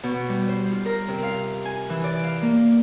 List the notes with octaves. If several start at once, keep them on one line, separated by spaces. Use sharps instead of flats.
B2
G3
C5
F4
A#4
C3
F5
G#5
E3
D5
F5
A#3